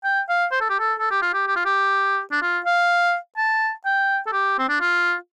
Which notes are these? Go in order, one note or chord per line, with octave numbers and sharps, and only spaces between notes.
G5
F5
C5
A4
G4
A4
A4
G4
F4
G4
G4
F4
G4
D4
F4
F5
A5
G5
A4
G4
C4
D4
F4